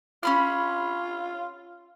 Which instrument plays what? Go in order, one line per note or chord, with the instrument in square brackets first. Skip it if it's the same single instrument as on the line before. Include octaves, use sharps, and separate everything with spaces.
[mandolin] C#4 B5 F6 [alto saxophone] F4